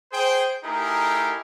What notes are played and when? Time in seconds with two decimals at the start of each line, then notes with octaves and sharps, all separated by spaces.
0.12 G#4 C5 G5
0.63 A3 D#4 E4 G4 G#4 A#4